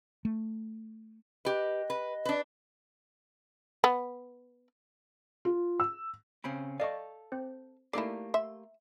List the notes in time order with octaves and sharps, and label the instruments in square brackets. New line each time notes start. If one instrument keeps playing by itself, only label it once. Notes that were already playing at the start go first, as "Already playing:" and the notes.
[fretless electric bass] A3
[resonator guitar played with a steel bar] G4 B4 [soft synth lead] D#5
[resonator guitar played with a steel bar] B4
D4 B4
[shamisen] B3
[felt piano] F4
E6
[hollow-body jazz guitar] C#3 C4 C#4 [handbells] B5
[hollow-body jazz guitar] A4 F5 [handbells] D5 D#5 C#6
[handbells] C4 C5
[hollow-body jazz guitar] A3 A#3 G4 [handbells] D#4 A4 C7 [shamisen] E4 D5
[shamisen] E5 [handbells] C6